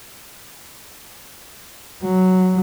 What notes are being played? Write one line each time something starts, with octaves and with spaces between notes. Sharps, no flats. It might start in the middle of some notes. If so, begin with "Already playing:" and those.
F#3